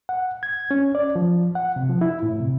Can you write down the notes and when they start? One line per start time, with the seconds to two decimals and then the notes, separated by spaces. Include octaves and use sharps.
0.09 F#5
0.43 G#6
0.71 C#4
0.95 D5
1.16 F3
1.55 F#5
1.76 C3
1.89 F3
2.01 E4
2.23 A2
2.40 C3